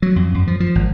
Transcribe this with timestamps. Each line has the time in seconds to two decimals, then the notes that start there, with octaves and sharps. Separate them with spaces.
0.02 F#3
0.16 F2
0.34 F#2
0.47 F3
0.60 F3
0.75 G#1